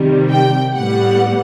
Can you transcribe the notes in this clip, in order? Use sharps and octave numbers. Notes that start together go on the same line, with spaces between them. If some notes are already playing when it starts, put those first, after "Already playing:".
Already playing: C3 D#3 G3
G5
A2 G3 B3 F#5